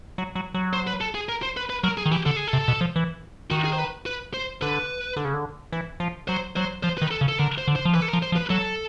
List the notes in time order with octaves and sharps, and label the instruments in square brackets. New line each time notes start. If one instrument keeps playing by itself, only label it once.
[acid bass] F#3
F#3
F#3
[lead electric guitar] C5
B4
A4
G#4
A#4
C5
B4
B4
[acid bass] F#3 [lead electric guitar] A#4
[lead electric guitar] G#4
[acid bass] D#3
[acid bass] E3 [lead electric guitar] G4
[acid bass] D3 [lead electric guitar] A4
[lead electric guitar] G#4
A4
[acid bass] C3
B2
F3
E3
[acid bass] D#3 [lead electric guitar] F#4
[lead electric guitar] G#4
C5
B4
B4
C5
[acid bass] D3 [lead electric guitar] B4
[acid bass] D3
C#3
D3
E3
F3
[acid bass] F#3 [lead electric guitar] C5
[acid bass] F#3 [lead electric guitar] C5
[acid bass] F3 [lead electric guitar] C5
[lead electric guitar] B4
[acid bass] D#3
[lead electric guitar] A4
[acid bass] C#3
[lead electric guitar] A4
[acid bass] D3 [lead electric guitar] A#4
[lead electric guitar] C5
[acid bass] D3
[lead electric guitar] C5
[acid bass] F3
[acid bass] E3 [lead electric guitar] B4
[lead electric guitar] A4
A#4
[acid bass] F3
[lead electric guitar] C5
[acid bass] F3
[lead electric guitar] B4
[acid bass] F#3 [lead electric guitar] A4